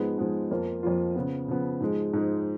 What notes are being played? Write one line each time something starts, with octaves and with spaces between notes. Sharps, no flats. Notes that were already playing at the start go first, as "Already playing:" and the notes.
Already playing: G#2 F3 G#3 B3
G#2 F3 G#3 B3
F2 F3 A#3 F4
F2 F3 A#3 F4
C#3 F3 B3
C#3 F3 B3
G#2 F3 G#3
G#2 F3 G#3